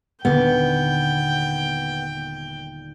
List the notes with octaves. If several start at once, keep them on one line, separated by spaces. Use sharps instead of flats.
D#1 D3 B3 G5